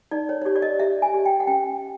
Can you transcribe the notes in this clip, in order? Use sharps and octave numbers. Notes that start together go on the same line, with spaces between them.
D#4 D5
C#5
C#5
G4 D5
D5
D#5
G4 E5
G#5
G4
G5
F#5
C#4 G5